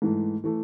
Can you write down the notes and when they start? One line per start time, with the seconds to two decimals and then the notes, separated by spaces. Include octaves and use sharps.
0.02 G#2 E3 A3
0.44 E3 A3